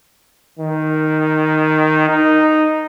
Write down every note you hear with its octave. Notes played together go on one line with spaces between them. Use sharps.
D#3
D#4